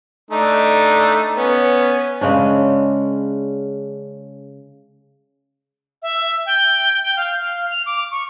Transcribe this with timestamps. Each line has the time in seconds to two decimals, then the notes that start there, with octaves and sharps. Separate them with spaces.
0.31 A3 D4 D#4
1.37 B3 C#4
2.21 C#3 G#3 C#4 D4
6.02 E5
6.46 G5
7.03 G5
7.16 F5
7.40 F5
7.71 F7
7.86 D6
8.11 C#6